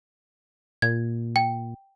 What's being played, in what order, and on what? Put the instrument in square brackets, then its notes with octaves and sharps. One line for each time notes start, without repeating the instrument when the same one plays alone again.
[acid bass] A#2 [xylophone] G#6
[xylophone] G5